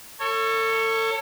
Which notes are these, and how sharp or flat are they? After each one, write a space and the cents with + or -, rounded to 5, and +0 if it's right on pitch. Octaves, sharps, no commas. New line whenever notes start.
A4 +35 C#5 -5